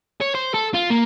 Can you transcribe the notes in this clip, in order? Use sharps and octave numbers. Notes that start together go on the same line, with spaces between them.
C#5
C5
A4
F4
A#3